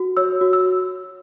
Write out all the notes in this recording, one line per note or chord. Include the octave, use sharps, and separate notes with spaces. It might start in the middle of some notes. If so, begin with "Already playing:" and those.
Already playing: F#4
C#5 E6
F#4
E6